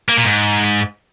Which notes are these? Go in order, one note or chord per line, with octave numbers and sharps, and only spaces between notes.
A#3
A#2
G#2